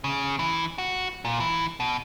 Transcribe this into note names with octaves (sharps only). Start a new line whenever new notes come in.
C#3
E3
F#4
A#2
E3
B2